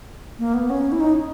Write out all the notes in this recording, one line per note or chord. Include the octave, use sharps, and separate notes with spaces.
A#3
B3
C#4
E4
D#4